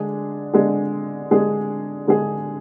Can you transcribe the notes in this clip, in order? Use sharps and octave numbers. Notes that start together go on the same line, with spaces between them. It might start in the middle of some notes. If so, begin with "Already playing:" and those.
Already playing: D3 G#3 D4 G#4
D3 G#3 D4 G#4
D3 G#3 D4 G#4
D3 G#3 D4 G#4